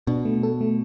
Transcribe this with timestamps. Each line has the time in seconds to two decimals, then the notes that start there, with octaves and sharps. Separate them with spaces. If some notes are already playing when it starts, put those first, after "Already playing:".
0.07 B2 D4
0.25 A3
0.43 A4
0.61 A3